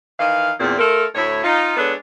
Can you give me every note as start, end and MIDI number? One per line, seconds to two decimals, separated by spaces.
0.19 0.52 51
0.19 0.52 52
0.19 0.52 75
0.19 0.52 77
0.60 0.77 40
0.60 0.77 46
0.60 0.77 60
0.78 1.05 57
0.78 1.05 65
0.78 1.05 69
0.78 1.05 70
1.14 1.42 38
1.14 1.42 45
1.14 1.42 64
1.14 1.42 73
1.43 1.72 63
1.43 1.72 65
1.77 1.93 56
1.77 1.93 59
1.77 1.93 62
1.77 1.93 69
1.77 1.93 71
1.77 1.93 73